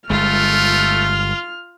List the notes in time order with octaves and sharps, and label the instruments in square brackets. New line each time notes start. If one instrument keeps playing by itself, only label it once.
[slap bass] G1 G#3 [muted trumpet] A3 [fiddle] F4 [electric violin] F6